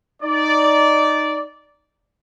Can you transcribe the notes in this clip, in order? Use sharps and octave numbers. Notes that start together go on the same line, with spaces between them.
D#4 D5